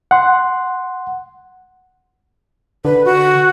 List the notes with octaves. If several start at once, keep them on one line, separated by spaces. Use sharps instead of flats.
F#5 C6
D3 B4
F#4